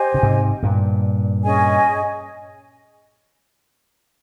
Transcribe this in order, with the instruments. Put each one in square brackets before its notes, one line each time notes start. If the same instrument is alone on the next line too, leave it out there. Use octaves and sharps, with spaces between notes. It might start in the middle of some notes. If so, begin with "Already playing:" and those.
Already playing: [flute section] G4 C5 D#5 G#5
[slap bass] C#3
G#2 C3
G2 A#2
[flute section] C#4 G#4 D#5 G#5